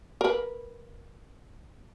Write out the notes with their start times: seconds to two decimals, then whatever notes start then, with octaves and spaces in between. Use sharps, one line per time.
0.21 A#4 B4